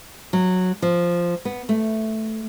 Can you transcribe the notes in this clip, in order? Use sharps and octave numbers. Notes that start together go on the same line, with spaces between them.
F#3
F3
B3
A3